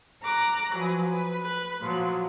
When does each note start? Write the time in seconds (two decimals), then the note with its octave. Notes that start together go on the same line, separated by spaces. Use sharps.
0.23 A#5 D6 F#6 A#6
0.74 F3 F#3 B4 G#5
1.10 B4
1.42 B4
1.80 A#2 F3 F#3